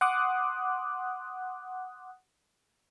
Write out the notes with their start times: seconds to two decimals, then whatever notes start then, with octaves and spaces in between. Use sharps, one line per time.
0.01 F#5 C6 D6 D#6 F#6